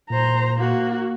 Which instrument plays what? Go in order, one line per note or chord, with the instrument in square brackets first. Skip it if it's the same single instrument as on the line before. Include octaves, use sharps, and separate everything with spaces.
[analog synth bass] A#2 [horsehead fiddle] C5 A#5
[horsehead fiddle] A#3 F#4